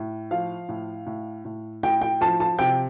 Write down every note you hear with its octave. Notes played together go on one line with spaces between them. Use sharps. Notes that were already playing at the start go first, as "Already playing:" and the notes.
Already playing: A2
F3 F5
A2
A2
A2
A2 G5
G5
F3 A5
A5
C3 G5